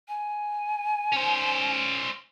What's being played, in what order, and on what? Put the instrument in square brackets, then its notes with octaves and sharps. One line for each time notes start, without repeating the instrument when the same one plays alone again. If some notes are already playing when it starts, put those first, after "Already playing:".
[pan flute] G#5
[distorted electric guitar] C#4 C5